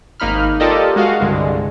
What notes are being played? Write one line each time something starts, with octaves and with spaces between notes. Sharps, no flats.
G#1 A#3 D#4 B5 F6
F4 G4 A4 A#4 D5 D#5
G#3 F#4 D#5 F5
C2 G2 D3 G#3